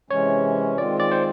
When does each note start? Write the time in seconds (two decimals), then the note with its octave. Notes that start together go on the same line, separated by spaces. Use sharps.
0.10 C3 E3 G#3 C#4 C#5
0.77 D#3 G#3 C4 F4 D5
1.00 D5
1.11 C5